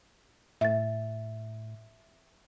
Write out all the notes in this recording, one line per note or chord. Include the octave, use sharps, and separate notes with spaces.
A2 E5 A6